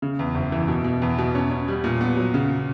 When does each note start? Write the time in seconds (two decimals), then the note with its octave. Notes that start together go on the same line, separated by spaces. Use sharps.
0.02 C#3
0.19 E2
0.35 F#1
0.52 E3
0.68 B2
0.84 B2
1.02 E2
1.18 B2
1.35 C#4
1.51 C#4
1.68 G3
1.84 A#2
2.01 B3
2.17 F#3
2.34 C#3